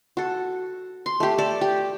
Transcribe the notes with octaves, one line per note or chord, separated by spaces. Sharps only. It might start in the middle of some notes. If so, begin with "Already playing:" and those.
F#4 A4
C6
A3 G4
A4 D5
G4